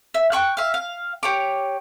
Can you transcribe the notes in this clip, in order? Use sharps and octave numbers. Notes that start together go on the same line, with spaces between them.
E5
G5 C#6 F#6
E5 F5
F5
G4 C#5 D6